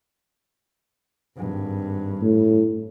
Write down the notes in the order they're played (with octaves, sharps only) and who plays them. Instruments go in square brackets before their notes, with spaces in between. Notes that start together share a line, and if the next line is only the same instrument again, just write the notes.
[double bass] G#1 G2
[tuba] A2